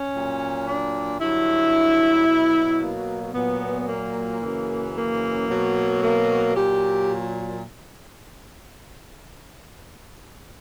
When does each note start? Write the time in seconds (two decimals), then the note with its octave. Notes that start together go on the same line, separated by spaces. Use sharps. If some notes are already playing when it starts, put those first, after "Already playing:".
Already playing: C#4
0.13 A#2 F#3
0.66 D4
1.20 G2 D3 F#3 E4
2.27 B2 F#3
2.81 A#3
3.34 A#2 F#3 B3
3.88 A#3
4.41 F#2 C#3 E3
4.95 A#3
5.48 B2 F#3
6.02 A#3
6.55 A#2 F#3 G4